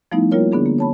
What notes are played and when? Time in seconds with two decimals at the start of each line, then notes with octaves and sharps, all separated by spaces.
0.12 F3 G3 A3 B3 D#4 E4
0.31 G3 A#3 E4 F4 A#4 C#5
0.52 D3 B3 D4 G#4
0.66 A#3
0.78 C#5 A5 B5